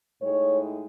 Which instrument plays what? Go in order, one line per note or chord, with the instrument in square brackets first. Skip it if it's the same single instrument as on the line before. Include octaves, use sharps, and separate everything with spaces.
[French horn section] A2 G#3 D#4 C#5